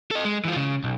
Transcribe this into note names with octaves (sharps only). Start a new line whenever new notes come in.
A4 D#5
G#3
E3 F4
C#3
B1